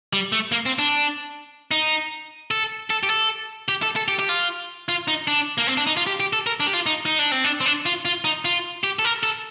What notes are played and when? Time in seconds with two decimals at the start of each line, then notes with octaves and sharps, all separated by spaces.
0.13 G3
0.32 A3
0.52 A#3
0.66 C4
0.79 D4
1.71 D#4
2.51 A4
2.90 A4
3.03 G4
3.10 A4
3.68 G4
3.83 A4
3.96 A4
4.08 G4
4.19 G4
4.29 F4
4.89 F4
5.08 D#4
5.27 D4
5.58 A#3
5.67 C4
5.77 D4
5.87 D#4
5.97 F4
6.07 G4
6.20 G4
6.33 A4
6.47 A#4
6.60 D4
6.67 G4
6.73 F4
6.86 D#4
7.05 D#4
7.19 D4
7.32 C4
7.44 D4
7.61 C4
7.66 D4
7.86 F4
8.05 F4
8.24 D#4
8.45 F4
8.84 G4
8.99 A4
9.05 A#4
9.23 A4